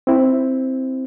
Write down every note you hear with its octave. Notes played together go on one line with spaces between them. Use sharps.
C4 E4